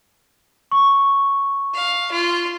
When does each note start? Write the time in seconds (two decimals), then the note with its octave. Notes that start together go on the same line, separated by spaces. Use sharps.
0.71 C#6
1.74 F5
2.12 F4